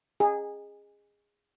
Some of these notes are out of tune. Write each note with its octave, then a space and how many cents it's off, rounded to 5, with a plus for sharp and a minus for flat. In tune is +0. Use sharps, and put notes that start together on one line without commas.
G#4 -15